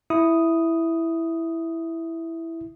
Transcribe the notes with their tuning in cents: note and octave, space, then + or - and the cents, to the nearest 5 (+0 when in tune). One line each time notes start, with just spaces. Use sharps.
E4 +0 D#6 +0